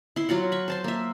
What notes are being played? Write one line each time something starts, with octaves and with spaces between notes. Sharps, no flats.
E4 C6
F#3 F4 F#4 F#5
B5 C#6
C5 A5 C6
A#3 E5